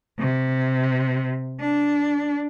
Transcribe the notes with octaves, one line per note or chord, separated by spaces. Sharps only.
C3
D4